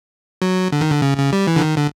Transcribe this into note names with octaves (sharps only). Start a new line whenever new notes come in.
F#3
D3
D#3
D3
C#3
C#3
G3
E3
D3
D#3
D3